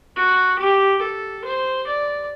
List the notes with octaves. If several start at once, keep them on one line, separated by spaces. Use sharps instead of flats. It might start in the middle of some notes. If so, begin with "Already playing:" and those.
F#4
G4
A4
C5
D5